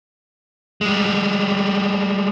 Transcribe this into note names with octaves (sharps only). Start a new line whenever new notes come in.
G3 G#3